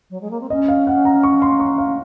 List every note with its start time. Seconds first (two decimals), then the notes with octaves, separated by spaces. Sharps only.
0.10 F#3
0.21 G#3
0.30 A#3
0.40 C4
0.50 C#4 D#5
0.68 F5
0.87 F#5
1.05 A#5
1.23 C#6
1.42 C6
1.60 C#6
1.78 F5